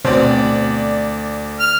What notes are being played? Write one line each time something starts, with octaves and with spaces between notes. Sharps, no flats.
D2 B2 C4 D5
F6